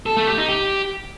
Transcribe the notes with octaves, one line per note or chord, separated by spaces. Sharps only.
A4
A3
G4
D#4
G4